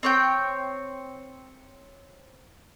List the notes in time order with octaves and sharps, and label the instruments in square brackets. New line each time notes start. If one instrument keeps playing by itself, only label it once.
[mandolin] C4 C#5 G5